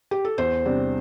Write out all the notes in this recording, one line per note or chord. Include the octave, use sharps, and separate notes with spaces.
G4
A4
E2 C5
C3 G3 D4